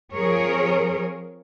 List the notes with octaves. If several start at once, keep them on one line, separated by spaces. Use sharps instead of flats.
F3 C4 G#4 A#4 C#5